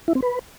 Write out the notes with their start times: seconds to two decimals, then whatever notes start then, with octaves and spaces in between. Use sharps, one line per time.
0.08 E4
0.15 C4
0.23 B4